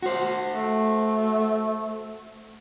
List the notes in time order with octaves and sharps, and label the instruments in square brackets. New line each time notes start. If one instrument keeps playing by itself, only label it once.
[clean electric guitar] F#4 C5
[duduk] A3